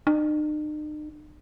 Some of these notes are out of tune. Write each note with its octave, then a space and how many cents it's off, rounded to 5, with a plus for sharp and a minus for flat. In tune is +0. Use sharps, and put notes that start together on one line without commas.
D#4 -45